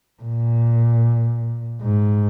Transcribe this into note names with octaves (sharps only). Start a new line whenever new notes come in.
A#2
G#2